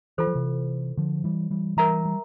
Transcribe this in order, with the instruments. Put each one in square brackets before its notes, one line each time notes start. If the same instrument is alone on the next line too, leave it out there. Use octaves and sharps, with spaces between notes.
[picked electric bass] E3 [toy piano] F4 A4 C5
[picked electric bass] F3
C3 E3
D3 F3
E3 G3
E3 G3
[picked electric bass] E3 G3 [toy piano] A#4 E5 A#5
[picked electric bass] G3